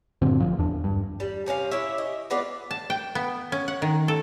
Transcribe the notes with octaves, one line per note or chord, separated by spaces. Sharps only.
G2 A#2 D3 C4
A1 F3
E2 D4
G2
G3
C3 C#4 D4 F5
E4 G4 C#5 E5
D#5
G#3 B3 F4 D5
A5
G5
B3
C#4
F#5
D#3
A4